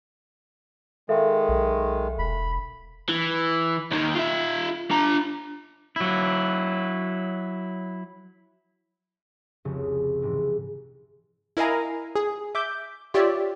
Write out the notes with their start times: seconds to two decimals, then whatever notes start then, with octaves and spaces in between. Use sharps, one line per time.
1.09 D#3 G#3 A4 E5 F5
1.49 B1
2.19 E1 B5
3.09 E3
3.92 D#2 D#3
4.15 F4 E5
4.91 D4 A#5
5.96 F#3 E4
9.65 F1 C2 C#3
10.22 G#2 C3 E3
11.57 E4 A#4 D#5 F5 G#5 A#5
12.16 G#4
12.55 E5 D6 G6
13.14 F4 G4 C#5 D5 E5